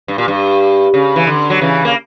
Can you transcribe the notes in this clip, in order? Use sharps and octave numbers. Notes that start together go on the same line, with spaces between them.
G2
A#2
G2
C#3
E3
D3
F#3
C#3 E3
A#3